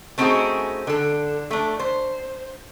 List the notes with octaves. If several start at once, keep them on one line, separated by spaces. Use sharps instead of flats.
A3 C4 C#4 D#4 F#4 G#4
D3 A4
A3 D4
C5